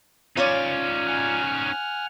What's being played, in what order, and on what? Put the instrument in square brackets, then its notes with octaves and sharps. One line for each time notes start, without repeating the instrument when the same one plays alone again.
[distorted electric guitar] C#4 D#4 [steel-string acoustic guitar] F4 C#5 D5
[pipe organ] F#5 G#5 F6